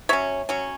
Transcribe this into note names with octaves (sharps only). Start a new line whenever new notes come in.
F#3 C#4 C#5 E5
F#3 C#4